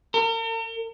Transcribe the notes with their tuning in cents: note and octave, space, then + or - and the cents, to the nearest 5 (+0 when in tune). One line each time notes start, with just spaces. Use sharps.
A#4 -45